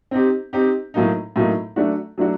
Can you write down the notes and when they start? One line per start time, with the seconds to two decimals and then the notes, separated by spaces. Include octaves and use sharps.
0.11 C4 D#4 G4
0.53 C4 D#4 G4
0.94 A2 F#3 A#3 D#4
1.36 A2 F#3 A#3 D#4
1.76 F#3 A3 D4 F#4
2.18 F#3 A3 D4 F#4